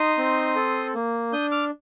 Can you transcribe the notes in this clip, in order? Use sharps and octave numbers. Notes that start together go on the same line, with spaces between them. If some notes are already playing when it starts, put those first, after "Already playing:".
Already playing: D#4 C6 D#6
C4
A4
A#3
D4 D#6 G6
D6 F6